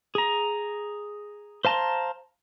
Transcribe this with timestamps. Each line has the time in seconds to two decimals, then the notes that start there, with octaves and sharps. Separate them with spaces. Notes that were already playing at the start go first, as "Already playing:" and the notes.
0.15 G#4 A#5
1.65 C5 F5 A5 A#5 C6